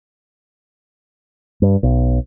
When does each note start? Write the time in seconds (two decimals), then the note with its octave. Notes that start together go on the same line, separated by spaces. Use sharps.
1.62 G2
1.83 B1